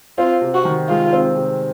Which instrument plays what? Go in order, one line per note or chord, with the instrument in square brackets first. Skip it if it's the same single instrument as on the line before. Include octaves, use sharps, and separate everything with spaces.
[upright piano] C4 [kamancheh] F4
[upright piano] C3
[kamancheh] F#4
[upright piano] D#3
[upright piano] G#3 [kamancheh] F4
[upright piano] C4
C3